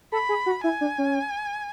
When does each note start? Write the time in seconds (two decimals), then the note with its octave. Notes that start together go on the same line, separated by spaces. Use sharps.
0.12 A4 B5
0.29 G#4
0.46 F#4
0.64 E4 G#5
0.81 D4
0.98 C#4